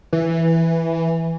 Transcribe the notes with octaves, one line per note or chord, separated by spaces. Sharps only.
E3